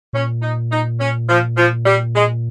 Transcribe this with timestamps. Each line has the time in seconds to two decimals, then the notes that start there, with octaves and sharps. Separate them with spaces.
0.13 A#2 C#4
0.42 D#4
0.71 D#4
0.99 C#4
1.28 F3
1.57 F3
1.86 G3
2.14 G#3